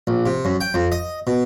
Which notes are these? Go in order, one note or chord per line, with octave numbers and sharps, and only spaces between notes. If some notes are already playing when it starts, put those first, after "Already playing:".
A#1
C3
F#2
G5
F2
D#5
B2